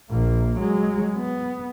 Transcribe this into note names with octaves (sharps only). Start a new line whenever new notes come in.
A#1 A#3
F#3 G#3
B3